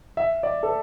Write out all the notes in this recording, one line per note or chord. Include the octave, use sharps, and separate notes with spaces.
E5
D5
A4